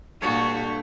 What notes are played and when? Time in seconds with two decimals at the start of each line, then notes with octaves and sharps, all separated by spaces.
0.22 G2 A#2 A3 F#4 C#5 A5 C#6